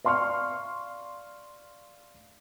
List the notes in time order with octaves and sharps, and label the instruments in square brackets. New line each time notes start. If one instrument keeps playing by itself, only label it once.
[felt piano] D5 F5 C6 C#6 F6